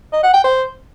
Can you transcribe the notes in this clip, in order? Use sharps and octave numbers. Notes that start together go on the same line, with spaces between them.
D#5
F#5
G5
C5